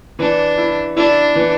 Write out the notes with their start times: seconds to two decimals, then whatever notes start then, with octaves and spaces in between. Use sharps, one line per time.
0.19 E3 D4
0.58 E4
0.96 D4 E4
1.35 E3